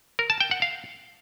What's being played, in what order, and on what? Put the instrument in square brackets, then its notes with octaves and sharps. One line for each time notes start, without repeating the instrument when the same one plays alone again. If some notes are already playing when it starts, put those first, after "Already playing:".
[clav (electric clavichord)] A#4
A5
G5
F#5
F5